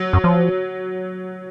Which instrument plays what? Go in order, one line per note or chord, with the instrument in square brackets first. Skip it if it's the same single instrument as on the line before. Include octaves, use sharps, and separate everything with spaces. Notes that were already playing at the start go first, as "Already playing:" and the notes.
Already playing: [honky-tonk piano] F#3
[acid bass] F#2
F3